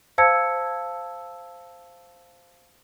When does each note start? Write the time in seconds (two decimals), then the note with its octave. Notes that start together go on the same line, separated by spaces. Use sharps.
0.18 C5 F5 A5 E6 G#6 C#7